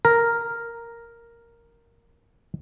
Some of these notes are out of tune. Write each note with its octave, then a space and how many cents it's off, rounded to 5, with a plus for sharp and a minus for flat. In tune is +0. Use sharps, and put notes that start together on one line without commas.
A#4 +0